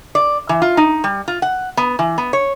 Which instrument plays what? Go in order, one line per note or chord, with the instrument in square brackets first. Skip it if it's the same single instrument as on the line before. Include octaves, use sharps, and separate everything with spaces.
[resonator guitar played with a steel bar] D5
E3
F4
D#4
G3
F4
F#5
B3
E3
B3
C#5